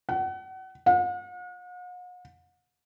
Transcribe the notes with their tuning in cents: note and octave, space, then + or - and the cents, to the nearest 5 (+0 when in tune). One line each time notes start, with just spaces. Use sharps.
F#5 +30
F#5 -45